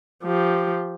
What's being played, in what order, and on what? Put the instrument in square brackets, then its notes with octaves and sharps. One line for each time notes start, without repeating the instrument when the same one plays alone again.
[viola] F3 G4